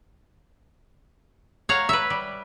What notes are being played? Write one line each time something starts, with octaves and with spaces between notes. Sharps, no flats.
C#5 F5 F#5 A#5
B4 E5
G3